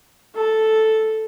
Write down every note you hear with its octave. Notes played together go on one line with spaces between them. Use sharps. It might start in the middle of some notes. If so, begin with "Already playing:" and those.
A4